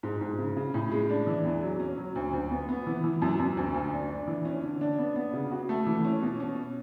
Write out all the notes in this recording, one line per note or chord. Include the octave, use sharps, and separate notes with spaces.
G#2
G#2
C#3
C#3
A2
G#3
D4
E3
E2
F#3
C#4
F#3
D2
D2
B3
B3
E3
E3
F#2
F#2
D2
D2
D4
D4
E3
C#4
D3
D4
B3
B3
C#3
F#4
A3
E3
C#4
B2
C#4